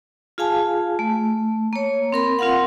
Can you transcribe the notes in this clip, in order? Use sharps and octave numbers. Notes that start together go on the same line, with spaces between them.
F4 G#4 F5 G#5 A5
A3
A#3 C#5
C4 A#4 B5
C4 F4 A#4 F5 F#5